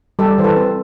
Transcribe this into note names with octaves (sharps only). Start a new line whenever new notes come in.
G3 G4 A4
E3 C5
A4 B4
C4